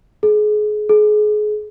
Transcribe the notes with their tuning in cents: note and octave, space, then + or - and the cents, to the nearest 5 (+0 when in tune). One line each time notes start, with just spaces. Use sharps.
G#4 +30
G#4 +30